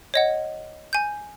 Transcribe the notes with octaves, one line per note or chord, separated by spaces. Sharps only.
C#5 D#5 F#5
G#5 G6